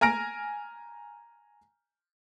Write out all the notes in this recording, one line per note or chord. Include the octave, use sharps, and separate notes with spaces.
G#5 A#5 F6 A#6 D7